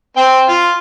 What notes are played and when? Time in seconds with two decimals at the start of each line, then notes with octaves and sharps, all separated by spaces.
0.17 C4 G5
0.49 F4